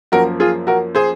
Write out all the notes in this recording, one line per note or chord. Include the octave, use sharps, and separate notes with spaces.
F#2 F3 A#3 F#4 A#4
F4 G#4
F#4 A#4
G#4 C5